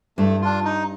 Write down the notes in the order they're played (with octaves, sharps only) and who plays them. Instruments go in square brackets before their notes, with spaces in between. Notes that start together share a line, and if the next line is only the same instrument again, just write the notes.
[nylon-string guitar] G2 [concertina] A3
[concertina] D4 F4
D#4